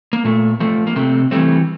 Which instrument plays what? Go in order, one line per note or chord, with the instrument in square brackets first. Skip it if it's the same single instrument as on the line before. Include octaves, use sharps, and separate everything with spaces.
[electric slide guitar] A#3
A#2 A3
F3 A3
A#3
C3 A3 C4
E3 G3 A3 C4